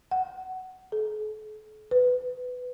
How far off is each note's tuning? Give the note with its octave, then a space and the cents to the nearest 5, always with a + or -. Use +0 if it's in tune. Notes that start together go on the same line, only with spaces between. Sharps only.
F#5 +15
A4 -45
B4 +15